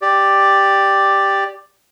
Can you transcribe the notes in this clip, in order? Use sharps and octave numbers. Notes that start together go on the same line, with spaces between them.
G4 D5